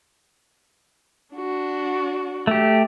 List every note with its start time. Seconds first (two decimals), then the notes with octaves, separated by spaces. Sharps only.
1.35 D4 F#4
2.47 A3 G4